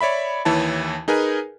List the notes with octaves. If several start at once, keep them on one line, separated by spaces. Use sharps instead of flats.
C#5 D5 E5 B5
D#2 E3 E4 C#5 A5
D#4 G#4 A#4 B4 G#5